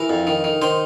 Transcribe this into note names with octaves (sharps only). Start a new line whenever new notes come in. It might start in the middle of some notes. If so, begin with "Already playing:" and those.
Already playing: E3 A#4
F2
D#3
D#3
D#3 C5